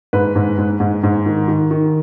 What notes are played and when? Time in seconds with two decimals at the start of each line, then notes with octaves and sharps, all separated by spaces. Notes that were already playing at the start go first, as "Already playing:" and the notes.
0.13 G#2 B4
0.36 G#2
0.58 G#2
0.80 G#2
1.03 G#2
1.26 D#3
1.48 D#3
1.71 D#3